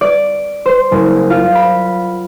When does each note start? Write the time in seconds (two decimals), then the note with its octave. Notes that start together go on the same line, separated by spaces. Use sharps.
0.01 D5
0.66 C5
0.91 F#1
1.30 F4
1.55 B5